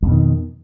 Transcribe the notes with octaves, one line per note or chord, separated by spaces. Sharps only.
F2 B2 D#3